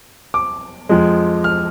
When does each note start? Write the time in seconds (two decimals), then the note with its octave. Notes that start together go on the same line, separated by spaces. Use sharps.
0.34 D6
0.89 F2 F3 G#3
1.44 F6